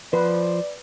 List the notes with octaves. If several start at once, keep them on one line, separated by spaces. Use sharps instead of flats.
F3 B4 C5 D5